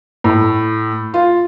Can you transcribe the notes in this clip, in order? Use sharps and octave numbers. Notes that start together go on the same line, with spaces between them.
A2
F4